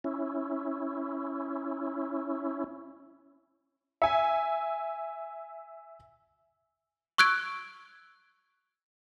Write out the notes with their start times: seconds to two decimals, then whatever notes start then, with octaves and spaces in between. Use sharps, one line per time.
0.04 C#4 E4
4.02 E5 G#5
7.18 C#6 E6 F#6 G#6 D7